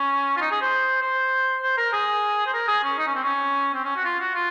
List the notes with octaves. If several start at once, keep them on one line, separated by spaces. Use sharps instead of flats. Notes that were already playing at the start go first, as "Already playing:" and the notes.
Already playing: C#4
F4
D#4
G#4
C5
C5
C5
A#4
G#4
C5
A#4
G#4
C#4
D#4
C#4
C4
C#4
C4
C#4
F#4
F4
F#4
F4